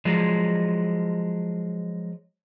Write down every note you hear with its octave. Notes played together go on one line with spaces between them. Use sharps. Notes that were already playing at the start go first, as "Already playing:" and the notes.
F3 F#3 G#3